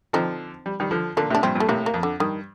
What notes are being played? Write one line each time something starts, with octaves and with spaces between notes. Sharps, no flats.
D3 F3 C4 D#4
G3
D#3 G3
D3 F3
A#2 D3 A#3 D4
A2 C3 D4
G2 A#2 C4
G2 A#2
A3
A2 C3 A#3
A#3
F2
D3
G2 D#3